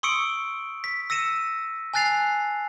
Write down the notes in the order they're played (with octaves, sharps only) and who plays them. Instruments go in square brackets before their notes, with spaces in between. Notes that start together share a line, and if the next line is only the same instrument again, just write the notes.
[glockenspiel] C6 C#6 D#6 E6 C#7 D7
B6
E6 A#6 C#7 D#7 E7
G#5 A5 F#6 A6 C7 F7